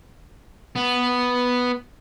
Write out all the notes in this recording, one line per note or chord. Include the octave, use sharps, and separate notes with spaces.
B3